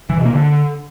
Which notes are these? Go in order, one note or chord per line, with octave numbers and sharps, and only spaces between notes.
E3
B2
A#3
D3